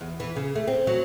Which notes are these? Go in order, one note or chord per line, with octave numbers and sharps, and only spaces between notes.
E2
E3
C#3
A3
C4
F#3